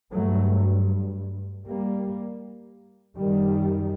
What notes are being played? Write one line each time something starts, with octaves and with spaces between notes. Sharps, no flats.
G2 F#3 A3
G3 A#3
F#2 D#3 G3